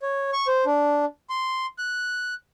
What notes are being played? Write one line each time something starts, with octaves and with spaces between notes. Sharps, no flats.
C#5
C#6
C5
D4
C6
F#6